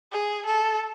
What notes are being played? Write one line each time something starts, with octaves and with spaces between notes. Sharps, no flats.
G#4
A4